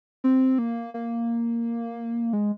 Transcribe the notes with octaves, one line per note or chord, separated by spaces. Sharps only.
C4
A#3
A#3
G#3